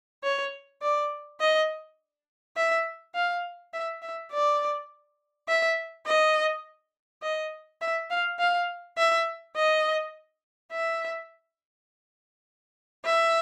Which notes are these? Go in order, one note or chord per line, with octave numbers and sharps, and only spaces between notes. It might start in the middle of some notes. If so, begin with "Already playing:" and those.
C#5
D5
D#5
E5
F5
E5
E5
D5
E5
D#5
D#5
E5
F5
F5
E5
D#5
E5
E5